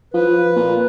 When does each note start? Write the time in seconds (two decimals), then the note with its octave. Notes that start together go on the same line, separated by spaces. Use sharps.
0.14 F3 B4
0.56 A#2